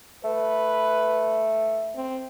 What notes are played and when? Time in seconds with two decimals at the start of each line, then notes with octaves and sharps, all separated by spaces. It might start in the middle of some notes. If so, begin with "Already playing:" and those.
0.24 A3 B4
1.96 C4